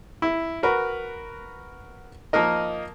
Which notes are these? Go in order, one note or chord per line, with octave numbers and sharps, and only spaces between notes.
E4
F#4 A#4 B4
F3 A#3 D#4 A#4 D#5